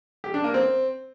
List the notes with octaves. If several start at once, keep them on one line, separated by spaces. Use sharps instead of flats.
G4
D4
A#3
C4